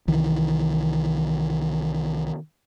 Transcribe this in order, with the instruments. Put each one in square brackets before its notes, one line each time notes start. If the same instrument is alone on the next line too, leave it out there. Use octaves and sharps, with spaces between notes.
[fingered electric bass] C2 D#3 E3